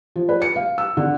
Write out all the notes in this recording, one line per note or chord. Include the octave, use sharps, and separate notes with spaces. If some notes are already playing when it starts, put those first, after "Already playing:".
F3
B4
C#7
F5
E6
D3